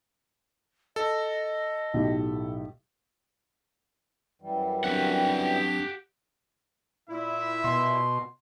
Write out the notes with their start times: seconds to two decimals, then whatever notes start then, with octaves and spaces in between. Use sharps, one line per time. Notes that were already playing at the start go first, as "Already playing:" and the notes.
0.96 A4 D#5
1.94 B1 A2 G4
4.42 F#2 E3 G3
4.84 F#3 C4 D4 G4 F#5
7.09 A#2 E4 E5
7.64 B2 C6